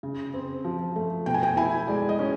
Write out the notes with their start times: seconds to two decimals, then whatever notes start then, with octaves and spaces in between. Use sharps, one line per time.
0.03 C#3
0.34 C4
0.65 F3
0.96 A3
1.26 B2 G5
1.34 G#5
1.43 G5
1.57 E4 G#5
1.88 G#3 D5
2.09 D#5
2.19 C#4